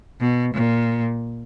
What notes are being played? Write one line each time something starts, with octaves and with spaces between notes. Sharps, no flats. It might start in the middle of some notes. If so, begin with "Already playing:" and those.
B2
A#2